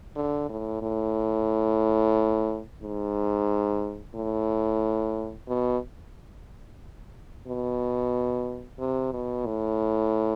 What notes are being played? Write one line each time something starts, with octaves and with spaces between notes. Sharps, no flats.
D3
A2
A2
G#2
A2
B2
B2
C3
B2
A2